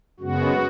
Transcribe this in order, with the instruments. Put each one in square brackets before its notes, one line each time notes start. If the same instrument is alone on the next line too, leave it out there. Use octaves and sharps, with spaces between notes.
[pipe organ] F#2 C#3 G#3 B3 F#4